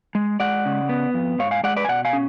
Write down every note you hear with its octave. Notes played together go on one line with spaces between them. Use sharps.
G#3
G#3 D5 F#5
C#3
B3
F2
G#2 C#5 F5
F5 G#5
G#3 D5 F#5
B4 D5
G#5
B2 D5 F#5
F5 G#5
C#4